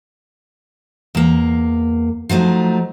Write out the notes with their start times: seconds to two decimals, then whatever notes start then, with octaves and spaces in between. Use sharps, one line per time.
1.15 E2 A#3
2.29 F3 F#3 A3 D#4